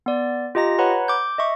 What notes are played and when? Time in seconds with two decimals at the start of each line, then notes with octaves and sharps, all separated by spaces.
0.06 B3 D5
0.55 F4 G4 D#5 A#5 A#6
0.79 B4 C#5 F#5 A#5 B5
1.08 D6 G6
1.38 D#5 E5 C#6